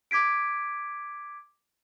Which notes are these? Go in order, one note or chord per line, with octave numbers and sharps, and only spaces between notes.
D6 G#6 B6 D7